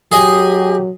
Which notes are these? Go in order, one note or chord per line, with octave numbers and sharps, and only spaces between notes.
F#3 G4 G#4 D#5 G#5